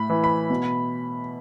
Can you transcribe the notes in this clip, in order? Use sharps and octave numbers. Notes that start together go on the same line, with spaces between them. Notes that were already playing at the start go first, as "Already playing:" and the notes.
Already playing: A2 B5
E3
B5
B2